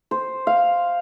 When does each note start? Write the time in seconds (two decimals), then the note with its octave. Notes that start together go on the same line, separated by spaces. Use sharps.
0.11 C5
0.47 F5